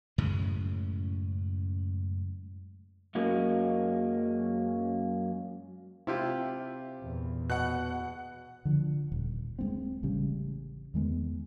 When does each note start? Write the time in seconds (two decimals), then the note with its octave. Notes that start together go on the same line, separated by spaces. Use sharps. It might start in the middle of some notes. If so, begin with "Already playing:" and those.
0.18 F#2 A2 C#3 G#3
3.15 F#2 F#3 G#3 A#3 C#4
6.07 C3 E4 F4 G4
6.96 E2 A#2
7.50 B2 F#5 F#6
8.65 D3 F3
9.12 D#1
9.59 G#3 B3 C4
10.03 A1 C#3 G3
10.94 E2 D#3 G#3 B3